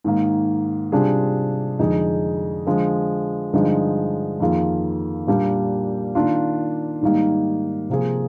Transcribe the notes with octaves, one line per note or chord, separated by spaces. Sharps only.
G#2 D#3 A#3
C3 G3 D4 F4 G#4
F2 D3 G#3 D#4 G#4
D3 F3 G#3
G2 D3 F3 G#3 D#4
F2 D#3 A#3 F4 G#4
A#2 G3 A#3 D4 G4
D#3 A#3 D4 F4
G#2 D#3 G3 A#3 D#4
C3 F3 A#3 F4 G#4